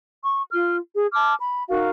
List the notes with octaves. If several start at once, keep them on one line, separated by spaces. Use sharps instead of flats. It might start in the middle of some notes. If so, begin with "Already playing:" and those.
C#6
F4 F6
G#4
A5 D6 F6
B5
D#4 F#4 A#4 F5